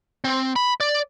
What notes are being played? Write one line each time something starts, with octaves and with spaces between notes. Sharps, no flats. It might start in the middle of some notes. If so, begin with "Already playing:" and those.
C4
B5
D5